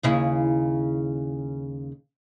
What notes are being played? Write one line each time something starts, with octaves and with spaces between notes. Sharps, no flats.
D#2 C#3 E4